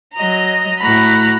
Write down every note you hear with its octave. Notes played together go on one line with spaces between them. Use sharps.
F#3 D#5 A#5
A2 F#4 A#5 B5